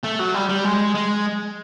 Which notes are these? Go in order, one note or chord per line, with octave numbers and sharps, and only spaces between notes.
A3
F#3
G3
G3
G#3
G#3